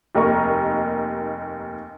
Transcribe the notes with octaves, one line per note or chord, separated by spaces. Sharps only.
F1 D#2 A#4 D#5 A#5 C#6